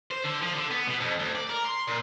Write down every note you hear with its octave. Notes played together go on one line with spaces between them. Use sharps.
C5
D3
F3
D3
B3
B2
F2
D2
D5
A#4
C6
A#2